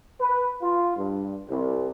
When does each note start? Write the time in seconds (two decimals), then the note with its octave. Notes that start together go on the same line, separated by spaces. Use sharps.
0.20 B4
0.61 F4
0.97 G2
1.49 C2